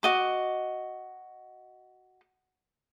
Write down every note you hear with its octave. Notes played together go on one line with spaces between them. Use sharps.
F#4 D#5 D6